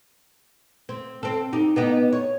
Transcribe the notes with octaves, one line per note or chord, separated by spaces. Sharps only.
C4
C4 A4
D#4 G4
B3 D#4 G4
C#5